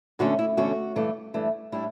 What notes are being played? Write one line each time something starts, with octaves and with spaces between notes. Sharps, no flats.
E2 D3 A3 C#4 F#4
E4
E2 D3 A3 C#4 F#4
G2 E3 A3 D4
G2 E3 A3 D4
A2 G3 D4 E4